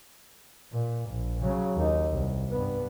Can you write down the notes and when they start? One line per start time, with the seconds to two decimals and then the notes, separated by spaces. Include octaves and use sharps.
0.72 A#2
1.10 A#1
1.43 C#3 F#3
1.76 D#2 D#4
2.12 C2
2.51 G2 B3